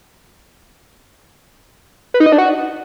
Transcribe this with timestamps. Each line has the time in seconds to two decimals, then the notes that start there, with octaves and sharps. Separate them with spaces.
2.14 B4
2.20 D#4
2.26 D#5
2.32 D4
2.38 F#4